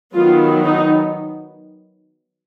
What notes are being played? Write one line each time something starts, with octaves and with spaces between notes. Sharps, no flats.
D#3 F#3 B3 F4
D#4